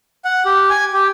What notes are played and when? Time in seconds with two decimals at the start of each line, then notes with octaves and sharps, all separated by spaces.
0.25 F#5
0.46 G4
0.70 G#5
0.93 G4